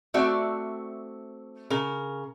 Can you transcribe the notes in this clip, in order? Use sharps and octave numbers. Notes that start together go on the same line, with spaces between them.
A3 C4 F#4 D5 E5
C#3 A#4